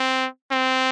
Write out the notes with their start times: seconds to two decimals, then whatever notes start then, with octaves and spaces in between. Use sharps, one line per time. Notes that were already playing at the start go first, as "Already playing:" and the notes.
Already playing: C4
0.51 C4